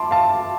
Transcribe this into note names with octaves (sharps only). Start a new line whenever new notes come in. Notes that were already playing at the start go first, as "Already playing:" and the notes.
Already playing: A5 C6 D6
F5 A5